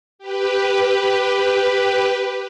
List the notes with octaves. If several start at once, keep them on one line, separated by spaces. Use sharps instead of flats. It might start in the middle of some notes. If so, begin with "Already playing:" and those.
G4 B4